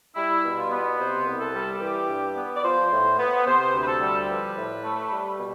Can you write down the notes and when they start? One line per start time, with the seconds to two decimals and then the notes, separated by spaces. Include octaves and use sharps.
0.16 G3 E4
0.44 B2
0.57 F4
0.71 B3
0.99 C3 C5
1.26 C2
1.39 A4
1.54 G3
1.81 E3 G4
2.08 G2
2.36 B3
2.56 D5
2.64 F3 C5
2.91 A2
3.18 B3
3.46 C3 C5
3.74 D2
3.82 B4
3.87 A4
4.01 G3
4.29 F3 B4
4.57 A2
4.84 A3
5.11 G3
5.39 B2